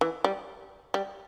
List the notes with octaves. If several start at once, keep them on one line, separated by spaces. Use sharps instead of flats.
E3
G3
G3